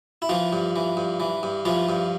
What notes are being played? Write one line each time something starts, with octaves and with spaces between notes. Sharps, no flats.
E4
E3 F3 F4
G2
E3
G2
E3
G2
E3 F3 F4
G2